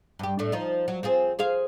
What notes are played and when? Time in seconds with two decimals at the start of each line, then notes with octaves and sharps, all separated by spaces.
0.19 G2 G4
0.39 A2 A3 D4
0.52 F3 D#4
0.88 F#3
1.03 C4 F4 G#4
1.39 G#4 C5 F5